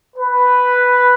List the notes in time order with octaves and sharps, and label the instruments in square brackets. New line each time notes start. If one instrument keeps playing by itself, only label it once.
[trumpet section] B4